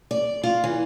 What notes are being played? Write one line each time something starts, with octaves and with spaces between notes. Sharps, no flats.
D5
F4
E3